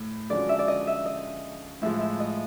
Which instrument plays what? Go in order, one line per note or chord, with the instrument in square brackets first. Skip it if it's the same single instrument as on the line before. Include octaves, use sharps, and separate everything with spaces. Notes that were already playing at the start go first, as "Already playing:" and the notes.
Already playing: [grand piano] A2
[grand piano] D3 F3 G#3 C#4 F#4 [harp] D5
[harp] E5
D5
D#5
E5
D#5
[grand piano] A2 F3 G#3 [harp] E5
[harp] E5
D#5